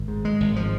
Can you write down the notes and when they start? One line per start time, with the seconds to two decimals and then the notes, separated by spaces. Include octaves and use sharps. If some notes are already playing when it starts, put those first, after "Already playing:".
Already playing: G#1
0.08 G#2
0.25 G#3
0.40 G#1
0.56 F3